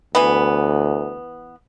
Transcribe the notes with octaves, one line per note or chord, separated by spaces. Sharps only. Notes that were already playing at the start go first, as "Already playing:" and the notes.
D2 E3 B3